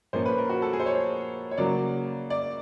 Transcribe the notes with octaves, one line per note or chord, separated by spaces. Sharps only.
A#2 F3 A#3 C#4 C5
B4
A#4
F#4
A4
G#4
C5
C#5
C#5
C#3 F#3 A#3 D5
D5